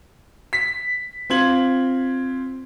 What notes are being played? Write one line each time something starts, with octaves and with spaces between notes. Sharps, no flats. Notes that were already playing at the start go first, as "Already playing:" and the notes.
B6
C4 F4 G#6 F#7